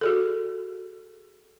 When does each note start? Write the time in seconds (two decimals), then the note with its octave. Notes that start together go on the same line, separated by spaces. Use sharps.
0.01 F#4 G#4 A4